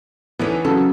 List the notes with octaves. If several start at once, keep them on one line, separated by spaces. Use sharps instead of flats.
D#2 D3 E3 B3 C#4
C#3 F#3 A4